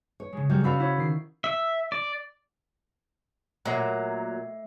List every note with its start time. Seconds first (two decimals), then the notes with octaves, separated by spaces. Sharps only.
0.20 C#5
0.33 C#3 G#3
0.50 F#3 G3 F6 G6
0.64 C#4 F#4 D5 F5 B5 E6
0.80 E4 C#5
0.97 D#3 C7
1.44 E5
1.92 D5
3.65 A#2 F#3 A3 E5 C7